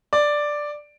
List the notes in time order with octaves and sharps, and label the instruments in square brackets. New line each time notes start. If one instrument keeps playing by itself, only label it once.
[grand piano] D5